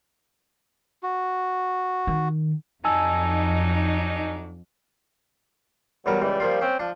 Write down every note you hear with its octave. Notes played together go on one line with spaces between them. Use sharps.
F#4
D#3
F2 F#3 D4 D#4 G#5 A5 E6
E2 F#3 G3 A#4
C#2 E3 G3
F3 A#3 F4
C4 C#4
F3 D4